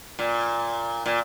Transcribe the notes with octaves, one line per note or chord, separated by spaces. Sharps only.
A#2
A#2